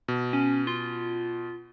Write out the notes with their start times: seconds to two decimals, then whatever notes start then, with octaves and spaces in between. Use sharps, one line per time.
0.08 B2
0.33 C#4
0.67 F4